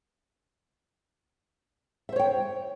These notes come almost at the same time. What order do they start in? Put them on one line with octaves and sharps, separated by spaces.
E5 C5 C#5 G5